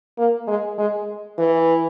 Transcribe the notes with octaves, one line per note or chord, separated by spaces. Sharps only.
A#3
G#3
G#3
E3